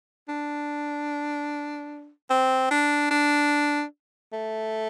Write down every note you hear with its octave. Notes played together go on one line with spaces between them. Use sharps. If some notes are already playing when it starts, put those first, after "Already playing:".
D4
C4
D4
D4
A3